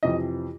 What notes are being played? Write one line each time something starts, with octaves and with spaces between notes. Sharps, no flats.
F2 C3 E3 D#5